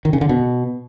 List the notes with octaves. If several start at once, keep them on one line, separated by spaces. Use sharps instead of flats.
D#3
C#3
D3
B2